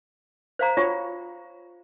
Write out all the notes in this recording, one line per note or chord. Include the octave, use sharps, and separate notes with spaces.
C5 F5 A#5
F4 C#5